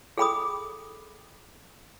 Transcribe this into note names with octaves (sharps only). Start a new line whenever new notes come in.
G#4 A4 G5 B5 D6 D#6